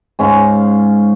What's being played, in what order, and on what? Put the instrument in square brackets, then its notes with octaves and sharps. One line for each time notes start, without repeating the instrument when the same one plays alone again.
[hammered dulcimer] G#2 C#4 F5